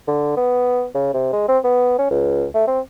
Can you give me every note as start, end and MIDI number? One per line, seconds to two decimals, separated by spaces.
0.08 0.36 50
0.36 0.86 59
0.94 1.11 49
1.13 1.31 48
1.32 1.47 56
1.48 1.58 60
1.64 1.98 59
1.99 2.08 61
2.10 2.46 37
2.54 2.65 57
2.67 2.80 60